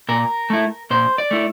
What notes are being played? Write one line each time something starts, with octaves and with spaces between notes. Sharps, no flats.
A#2 A#4
A3 E4
A#2 C5
D5
A3 E4